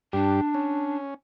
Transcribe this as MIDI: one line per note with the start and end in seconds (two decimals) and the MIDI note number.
0.13 0.41 43
0.13 0.96 62
0.13 0.41 67
0.54 1.14 61